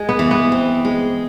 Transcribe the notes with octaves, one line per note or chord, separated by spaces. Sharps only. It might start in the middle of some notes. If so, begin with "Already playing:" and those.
Already playing: G#3
B3
E3
B3
C4
G#3